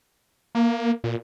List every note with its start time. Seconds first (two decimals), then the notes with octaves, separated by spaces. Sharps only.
0.55 A#3
1.04 A#2